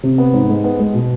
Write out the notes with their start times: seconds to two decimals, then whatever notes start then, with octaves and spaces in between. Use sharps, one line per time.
0.03 C3
0.18 B3
0.34 G#2
0.49 G#3
0.64 B3
0.79 G#3
0.94 B2